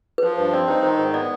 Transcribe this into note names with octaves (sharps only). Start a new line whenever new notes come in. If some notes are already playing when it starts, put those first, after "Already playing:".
B4
F3 C5
G2
C4 D5
D#4 C5
D#3 C5
G#2 C5
B3 D5